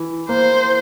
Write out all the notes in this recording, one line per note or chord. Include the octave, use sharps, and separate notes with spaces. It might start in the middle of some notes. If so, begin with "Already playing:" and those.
Already playing: E3
A#3 C5